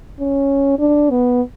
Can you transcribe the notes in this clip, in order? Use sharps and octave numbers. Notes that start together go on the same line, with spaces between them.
C#4
D4
B3